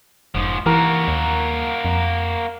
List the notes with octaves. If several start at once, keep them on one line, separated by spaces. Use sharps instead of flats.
F1 G#2 F3
E3 A#3 F#4 A#4
D#2
F2